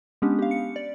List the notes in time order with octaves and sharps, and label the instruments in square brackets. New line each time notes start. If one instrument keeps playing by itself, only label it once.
[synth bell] G#3 B3 C#4 D4 G4
G4 F5
C#7
D5